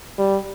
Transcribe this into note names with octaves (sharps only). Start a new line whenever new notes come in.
G3